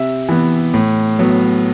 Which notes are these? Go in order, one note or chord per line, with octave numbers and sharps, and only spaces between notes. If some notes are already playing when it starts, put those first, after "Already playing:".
Already playing: C3 E5
E3 B3
A2
F#3 B3